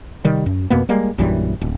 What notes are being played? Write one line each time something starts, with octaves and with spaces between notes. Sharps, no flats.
C3 D#3 G3
F#2
F2 B2 A#3 B3
G3 G#3 A#3
A#1 F#2 E3 G3
D1